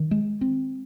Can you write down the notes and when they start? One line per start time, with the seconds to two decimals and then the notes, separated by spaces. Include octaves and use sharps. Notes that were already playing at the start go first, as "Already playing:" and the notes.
Already playing: D#3
0.11 G#3
0.41 C4